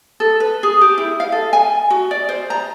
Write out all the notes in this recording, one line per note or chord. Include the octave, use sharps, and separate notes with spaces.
A4
B4
G#4
G4
E4
F5
A4
G#5
F#4
D5
C5
A#5